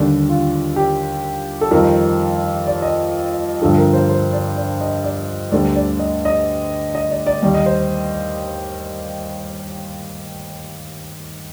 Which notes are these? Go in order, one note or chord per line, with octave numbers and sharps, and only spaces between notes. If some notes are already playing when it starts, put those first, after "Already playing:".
Already playing: D#2 D3 G3 D4
F4
G4
A4
F2 D#3 G3 A#4
D5
D#5
G2 D3 F3 A4
A#4
C5
C5
D5
D5
D#5
D5
D2 D3 G3 D5
D5
D#5
D#5
D#5
D5
D5
D#2 D#3 G3
D#5
C5